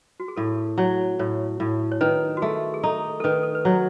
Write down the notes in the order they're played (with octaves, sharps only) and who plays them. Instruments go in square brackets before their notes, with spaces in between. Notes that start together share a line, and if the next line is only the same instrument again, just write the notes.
[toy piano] F#4
G#4
[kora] A2 [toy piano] A4
[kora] F#3 [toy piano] C#5
[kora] A2 [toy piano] C#5
[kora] A2
[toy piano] C#5
[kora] D#3 [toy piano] B4
[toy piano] F#4
[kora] A3 [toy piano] G#4
[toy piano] G#4
[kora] D#4 [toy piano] A4
[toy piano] A4
[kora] D#3 [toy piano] B4
[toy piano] A4
B4
[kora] F#3 [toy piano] C#5